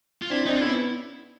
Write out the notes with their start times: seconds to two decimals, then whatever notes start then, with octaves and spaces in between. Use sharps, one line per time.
0.22 F4
0.30 C4 D4 E4
0.46 C4 D4 D#4
0.56 F4
0.62 B3 C#4 E4